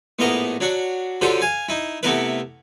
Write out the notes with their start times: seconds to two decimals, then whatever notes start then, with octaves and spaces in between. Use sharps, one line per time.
0.19 A#1 A2 B3 A#4 D#5 A#5
0.61 F#3 D4 F#4
1.21 D3 F3 F#3 G4 A4 C5
1.41 F5 G#5
1.69 D#4 E4
2.03 C3 A3 B3 E4 A#4 B4